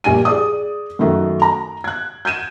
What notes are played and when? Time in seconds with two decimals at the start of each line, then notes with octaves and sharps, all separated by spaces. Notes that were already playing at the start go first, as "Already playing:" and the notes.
0.04 A#1 G3 G#5 D#7
0.25 G#4 D5 D#6
0.99 F#2 D#3 A3 F#4
1.42 A#5
1.84 F#6 G#6
2.25 G6 G#6 D#7 E7